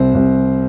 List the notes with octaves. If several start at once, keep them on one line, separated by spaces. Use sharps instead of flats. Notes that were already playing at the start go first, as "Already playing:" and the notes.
Already playing: C2 C4 C5
C2